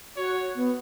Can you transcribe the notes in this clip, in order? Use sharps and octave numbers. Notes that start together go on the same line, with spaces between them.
F#4 C#5
B3